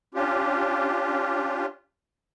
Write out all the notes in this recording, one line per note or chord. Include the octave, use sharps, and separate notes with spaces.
C#4 D4 F4 G4